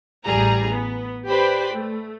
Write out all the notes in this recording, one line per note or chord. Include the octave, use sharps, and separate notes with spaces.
A1 G3 G#4 A#5
B3
G4 B4 C5 D5 G5 B5
A3